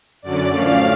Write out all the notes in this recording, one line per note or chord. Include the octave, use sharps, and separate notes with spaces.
F#2 D3 F#3 C#4 D5
A2 F3 A3 C#4 F5